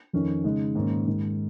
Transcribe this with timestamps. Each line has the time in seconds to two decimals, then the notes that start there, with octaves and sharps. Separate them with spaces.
0.13 F2 D#3 C#4
0.44 C#3 G#3 D#4
0.75 G#2 D#3 A#3 C#4
1.07 G#2 D#3 G#3